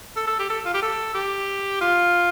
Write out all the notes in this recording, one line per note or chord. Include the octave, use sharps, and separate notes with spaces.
A4
A4
G4
A4
F4
G4
A4
G4
F4